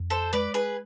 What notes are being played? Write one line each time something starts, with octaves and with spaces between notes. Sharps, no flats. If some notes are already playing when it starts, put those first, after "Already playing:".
Already playing: F2
A4 C5
G#3 B4 D5
G#4 B4